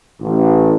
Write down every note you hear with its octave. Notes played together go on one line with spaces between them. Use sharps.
A1